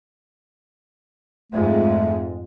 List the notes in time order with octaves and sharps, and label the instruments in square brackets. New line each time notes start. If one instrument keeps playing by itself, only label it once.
[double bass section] F2 G#2 G#3 [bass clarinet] A3